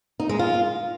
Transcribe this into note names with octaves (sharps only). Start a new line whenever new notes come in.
D#4
G#3
F4